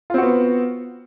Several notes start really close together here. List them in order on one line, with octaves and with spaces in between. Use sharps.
F4 C4 F#4 B3